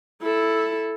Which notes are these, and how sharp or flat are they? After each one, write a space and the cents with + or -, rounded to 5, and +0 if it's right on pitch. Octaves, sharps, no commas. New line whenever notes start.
E4 +0 A4 +0